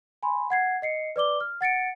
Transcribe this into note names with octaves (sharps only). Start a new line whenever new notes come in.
G#5 B5 C6
F#5 G#6 C7
D#5 C7 C#7
B4 D5 D6 G7
F6
F#5 A6 C#7 D7